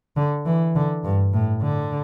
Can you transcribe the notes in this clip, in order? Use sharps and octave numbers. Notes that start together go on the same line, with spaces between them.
D3
E3
D3
G2
A2
D3